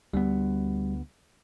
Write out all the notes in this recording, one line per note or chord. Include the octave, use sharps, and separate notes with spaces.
D2 G3 B3